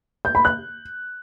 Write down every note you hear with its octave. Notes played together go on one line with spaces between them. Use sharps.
G6
B5
F#6